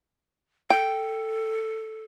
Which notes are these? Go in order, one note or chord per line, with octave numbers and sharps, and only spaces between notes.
A4 G5